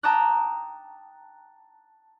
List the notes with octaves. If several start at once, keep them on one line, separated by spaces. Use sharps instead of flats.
G5 A5 A#5 D6 D#6 F#6